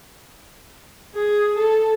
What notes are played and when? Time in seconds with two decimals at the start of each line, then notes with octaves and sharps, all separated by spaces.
1.15 G#4
1.57 A4